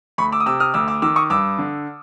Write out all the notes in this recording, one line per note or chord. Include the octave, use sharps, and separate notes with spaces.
D2 B5 C#6
D6 E6
D#6
C3 D6 E6
D#6 F6
D2 D6 E6
D6 E6
D#3 D6 E6
C#6 D#6
G2 D6 E6
D3